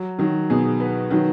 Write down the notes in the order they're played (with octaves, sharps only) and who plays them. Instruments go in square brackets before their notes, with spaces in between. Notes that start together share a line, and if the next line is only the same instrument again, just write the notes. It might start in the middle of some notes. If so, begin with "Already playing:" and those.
Already playing: [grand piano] F#3
[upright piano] D#3 [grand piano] F#3
[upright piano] B2 [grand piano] G#4
[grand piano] B3
[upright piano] D#3 [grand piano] F#3